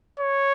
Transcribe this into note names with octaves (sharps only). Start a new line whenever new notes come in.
C#5